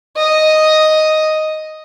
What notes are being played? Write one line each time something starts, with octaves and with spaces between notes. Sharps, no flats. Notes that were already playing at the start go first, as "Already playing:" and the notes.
D#5